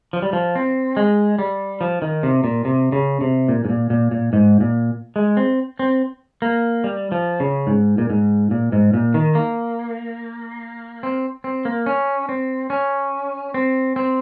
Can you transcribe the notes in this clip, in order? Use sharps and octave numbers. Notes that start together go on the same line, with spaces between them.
F3
G3
F3
C4
G#3
G3
F3
D#3
C3
A#2
C3
C#3
C3
A#2
G#2
A#2
A#2
A#2
G#2
A#2
G#3
C4
C4
A#3
G3
F3
C#3
G#2
A#2
G#2
A#2
G#2
A#2
D#3
A#3
C4
C4
A#3
C#4
C4
C#4
C4
C4